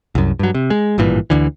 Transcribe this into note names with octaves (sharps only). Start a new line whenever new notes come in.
C2 F#2
G2 F#3
C3
G#3
G#1 G2 A#2 E3
D2 D3 E3